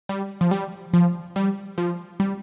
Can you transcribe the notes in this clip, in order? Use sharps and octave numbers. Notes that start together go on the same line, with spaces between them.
G3
F3
G3
F3
G3
F3
G3